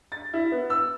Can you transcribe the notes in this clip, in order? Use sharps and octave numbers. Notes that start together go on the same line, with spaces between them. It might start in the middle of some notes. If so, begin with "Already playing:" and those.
A6
E4
B3
E6